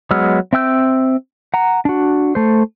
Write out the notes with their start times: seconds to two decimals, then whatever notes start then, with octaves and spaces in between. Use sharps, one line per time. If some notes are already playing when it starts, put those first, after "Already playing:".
0.11 F#3 G#3 B3 E6 F6
0.53 C4 E5 G5 E6 G6
1.54 F#5 A#5
1.85 D4 F#4
2.35 A3 C5